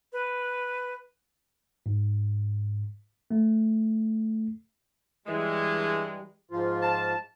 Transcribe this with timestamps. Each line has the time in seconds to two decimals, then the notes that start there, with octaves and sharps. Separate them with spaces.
0.13 B4
1.86 G#2
3.31 A3
5.26 G2 E3 G#3
6.51 G#2 F3 F4
6.82 A5